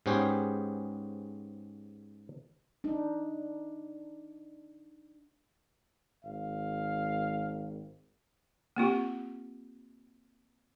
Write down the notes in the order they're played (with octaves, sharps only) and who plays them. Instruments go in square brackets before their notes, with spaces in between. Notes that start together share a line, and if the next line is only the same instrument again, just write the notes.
[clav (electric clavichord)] G#2 B3 C#4 G4 G#4 C5
[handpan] D4 D#4
[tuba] G#1 [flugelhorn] F5
[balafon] A#3 C4 F4 G4